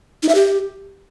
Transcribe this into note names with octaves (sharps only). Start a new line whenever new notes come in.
D#4
E5
G4